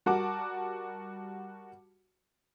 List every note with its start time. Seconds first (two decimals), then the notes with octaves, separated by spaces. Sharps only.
0.06 G3 F#4 A#4 F#5 A5 D6